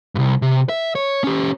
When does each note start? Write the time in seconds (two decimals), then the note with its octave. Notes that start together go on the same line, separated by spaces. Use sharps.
0.15 C2 G2
0.42 C3
0.69 E5
0.95 C#5
1.24 C#4 G4